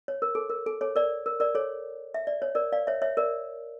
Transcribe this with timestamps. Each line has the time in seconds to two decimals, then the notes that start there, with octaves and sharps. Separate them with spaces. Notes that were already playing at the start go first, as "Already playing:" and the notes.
0.08 C#5
0.22 A#4
0.35 A4
0.50 A#4
0.66 A4
0.81 A4 C#5
0.96 A#4 D5
1.26 A#4
1.40 A#4 D5
1.55 A4 C#5
2.14 E5
2.27 D5
2.42 C#5
2.55 A#4 D5
2.72 D5 F5
2.87 C#5 E5
3.02 C#5 E5
3.17 A#4 D5